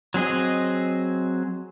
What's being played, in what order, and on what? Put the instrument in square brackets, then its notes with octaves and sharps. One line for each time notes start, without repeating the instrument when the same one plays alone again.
[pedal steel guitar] F#3 C4 G#4 D#5